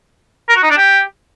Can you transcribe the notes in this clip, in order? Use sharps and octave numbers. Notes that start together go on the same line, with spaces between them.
A#4
F#4
D#4
D4
G4